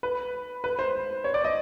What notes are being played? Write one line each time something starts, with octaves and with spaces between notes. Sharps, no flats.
B4
B4
C5
C#5
D5
D#5